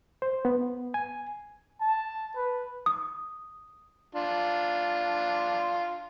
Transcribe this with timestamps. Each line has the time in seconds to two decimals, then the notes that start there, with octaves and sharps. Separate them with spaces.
0.22 C5
0.45 B3
0.94 G#5
1.81 A5
2.36 B4
2.86 D#6
4.15 D4 F4